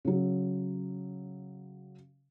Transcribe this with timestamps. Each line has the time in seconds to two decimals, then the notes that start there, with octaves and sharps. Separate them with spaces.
0.05 C#3 F#3